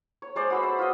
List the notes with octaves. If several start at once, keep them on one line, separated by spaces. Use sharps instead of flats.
C#5
G#3 C5 D5
F#4 B4 E6
C5 E5
F4 D#5